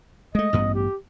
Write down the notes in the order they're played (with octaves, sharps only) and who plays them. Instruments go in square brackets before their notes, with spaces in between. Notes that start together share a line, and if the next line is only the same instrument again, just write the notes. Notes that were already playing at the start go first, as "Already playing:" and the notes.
[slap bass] G#3 A3 [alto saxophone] D#5
[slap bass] A1 G2 B3
[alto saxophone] G4